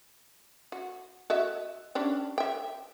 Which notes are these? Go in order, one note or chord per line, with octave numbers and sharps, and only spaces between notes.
F#4
F#4 D#5 E5
C#4 D4 G4
E5 G5